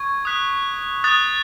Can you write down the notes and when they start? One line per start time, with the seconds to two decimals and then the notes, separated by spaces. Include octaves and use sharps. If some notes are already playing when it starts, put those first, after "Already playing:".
Already playing: C#6 G#6
0.25 D#6 F#6 B6
1.04 D#6 F#6 A6